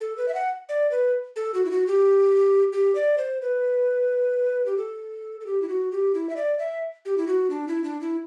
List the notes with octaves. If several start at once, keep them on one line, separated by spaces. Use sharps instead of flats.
A4
B4
E5
F#5
D5
B4
A4
F#4
E4
F#4
G4
G4
D5
C5
B4
G4
A4
A4
G4
E4
F#4
G4
E4
E5
D5
E5
G4
E4
F#4
D4
E4
D4
E4